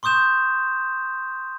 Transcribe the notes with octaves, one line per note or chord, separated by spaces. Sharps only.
C6 C#6 D#6 G6 E7